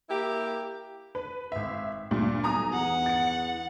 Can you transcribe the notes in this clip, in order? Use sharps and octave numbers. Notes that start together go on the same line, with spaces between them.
A#3 E4 G4
B4
G#1 E5
D2 G2 A#2
B1 G#5 A#5 D#6
E2 F#5
A6 C#7